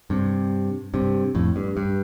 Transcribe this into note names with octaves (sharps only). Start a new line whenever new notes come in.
G2 C3
G2 C3
F2 A2
G2
G2